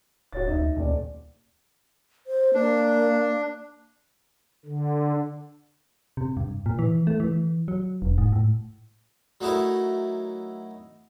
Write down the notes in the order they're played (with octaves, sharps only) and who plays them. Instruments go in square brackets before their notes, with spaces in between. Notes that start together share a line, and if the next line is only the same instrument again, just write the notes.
[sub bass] D1 [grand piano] F#4 C#5 A6
[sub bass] D2 [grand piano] D#4 D#5 E5
[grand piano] D#1 D5 [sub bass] D2
[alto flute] C5
[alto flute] A#3 [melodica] D4
[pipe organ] D3
[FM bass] C3
G2
A#2
E3
A3
E3
F#3
E1
G#2
A2
[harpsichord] F#3 A3 D#4 E4 A#4